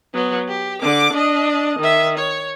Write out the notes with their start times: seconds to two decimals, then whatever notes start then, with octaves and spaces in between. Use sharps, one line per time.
0.14 F#3 B3
0.48 G4
0.82 D3 D6
1.13 D4 D#5
1.79 D#3 E5
2.18 C#5